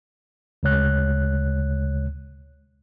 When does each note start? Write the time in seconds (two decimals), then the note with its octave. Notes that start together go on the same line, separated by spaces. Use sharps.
0.63 D2 C#3 G#3 C#5 F#6